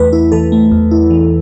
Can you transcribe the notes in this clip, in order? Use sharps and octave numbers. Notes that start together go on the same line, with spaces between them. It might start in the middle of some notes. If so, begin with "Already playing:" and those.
Already playing: E2 E3 A3 B4
E4
E3 A4
A3
E2
E4
E3